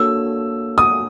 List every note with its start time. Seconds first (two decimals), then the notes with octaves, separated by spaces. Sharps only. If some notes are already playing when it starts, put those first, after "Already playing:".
Already playing: A#3 D4 F#4 A4 C#5 E6
0.78 D#6